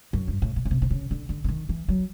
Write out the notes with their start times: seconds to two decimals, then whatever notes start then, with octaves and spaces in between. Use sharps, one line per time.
0.13 F#2
0.28 G2
0.42 A2
0.56 A#2
0.65 C#3
0.71 C3
0.82 C3
0.91 C#3
1.11 D3
1.29 D3
1.44 D3
1.48 D#3
1.69 E3
1.88 F#3